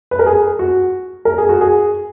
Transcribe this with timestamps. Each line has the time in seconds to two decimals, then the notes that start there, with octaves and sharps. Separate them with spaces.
0.11 B4
0.19 A#4
0.26 G#4
0.59 F#4
1.25 A#4
1.38 G#4
1.49 F#4
1.61 G#4